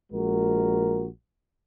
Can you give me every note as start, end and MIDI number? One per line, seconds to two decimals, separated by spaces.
0.12 1.06 34
0.12 1.06 56
0.12 1.06 66
0.12 1.06 70